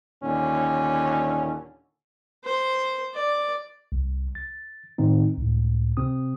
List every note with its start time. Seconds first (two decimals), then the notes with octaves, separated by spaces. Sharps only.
0.23 D#2 A#2 D3 C#4
2.44 C5
3.14 D5
3.92 C2
4.35 A6
4.98 A2 D#3 C4 D#4
5.38 C#2 A2
5.97 C3 C4 D#6